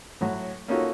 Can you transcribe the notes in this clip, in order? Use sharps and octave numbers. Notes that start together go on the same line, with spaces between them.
A2 F#3
A#3 C#4 D#4 F4 F#4 A4